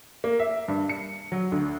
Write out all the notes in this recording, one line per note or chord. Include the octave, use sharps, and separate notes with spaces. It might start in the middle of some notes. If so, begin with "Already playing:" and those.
A#3
E5
G2
C#7
F#3
D2